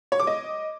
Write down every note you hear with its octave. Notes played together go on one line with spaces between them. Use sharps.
C#5
D6
D#5